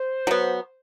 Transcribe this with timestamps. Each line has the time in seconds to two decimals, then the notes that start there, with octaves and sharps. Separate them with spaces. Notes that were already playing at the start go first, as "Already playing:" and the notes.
Already playing: C5
0.27 F#3 B3